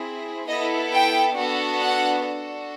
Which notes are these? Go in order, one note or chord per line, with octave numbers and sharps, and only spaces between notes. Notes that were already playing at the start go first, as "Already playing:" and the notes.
Already playing: C4 E4 G#4
B3 E4 A4 D#5
G5
B3 D4 F#4 A4
F#5
D4 F#4 A4